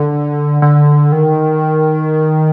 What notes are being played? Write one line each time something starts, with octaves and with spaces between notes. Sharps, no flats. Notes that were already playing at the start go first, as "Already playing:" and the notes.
Already playing: D3
D3
D#3